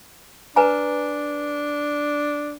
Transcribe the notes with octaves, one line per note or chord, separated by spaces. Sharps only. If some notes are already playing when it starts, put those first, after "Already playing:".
D4 B4 G#5 A#5